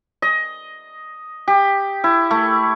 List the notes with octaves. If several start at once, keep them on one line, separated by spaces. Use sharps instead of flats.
D#5
G4
E4
A3